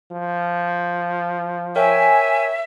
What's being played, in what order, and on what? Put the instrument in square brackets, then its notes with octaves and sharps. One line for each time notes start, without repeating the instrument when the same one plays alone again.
[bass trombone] F3
[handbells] A#4 C#5 G5 [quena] E5 [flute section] G#5